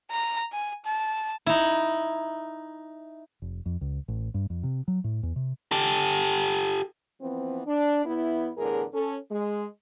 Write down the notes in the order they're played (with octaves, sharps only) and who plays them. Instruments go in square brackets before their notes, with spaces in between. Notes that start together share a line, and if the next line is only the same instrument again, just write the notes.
[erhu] A#5
G#5
A5
[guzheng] D#4 E4
[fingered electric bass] F1
F2
C#2
A1
G2
F2
C3
F#3
A2
E2
C3
[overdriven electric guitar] G4 A4
[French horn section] E3 F3 B3 C4
D4
E2 B3 E4
E2 A2 D3 G#4 A#4
C#4 A4
G#3